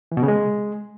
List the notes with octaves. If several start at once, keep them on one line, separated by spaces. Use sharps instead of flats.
E3
B2
C#3
G#3